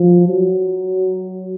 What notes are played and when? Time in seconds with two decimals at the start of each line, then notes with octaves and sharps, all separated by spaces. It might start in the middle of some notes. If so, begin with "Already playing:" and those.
Already playing: F3
0.28 F#3